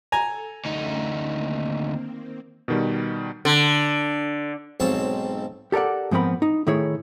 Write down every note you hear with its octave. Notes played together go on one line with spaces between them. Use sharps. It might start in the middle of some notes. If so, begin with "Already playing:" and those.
A4 G#5 A#5
D2 A3 C#4 D#4 E5
D#3 A#3 C4
B2 D#3 G3
D3
B1 G#2 C4 C#5 A5
G4 A4 A#4 D5 F#5
G#2 F3 B3 C4 A#4 B5
D#4
A2 D#3 E4 G#4 C#5